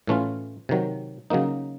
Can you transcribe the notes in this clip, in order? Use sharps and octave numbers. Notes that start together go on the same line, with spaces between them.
A2 E3 A3 C#4 F4
C3 D#3 F#3
C#3 F#3 A#3 D#4